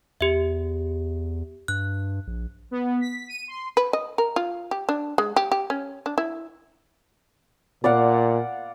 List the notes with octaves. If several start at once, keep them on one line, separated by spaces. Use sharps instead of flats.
E2 G4 E5
G2 F#6
A#1
B3
B6
D#7
C6
B4
D#5
A#4
F4
G4
D4
G#3
G4
G4
C#4
D4
E4
A#2 D5 F5 F#5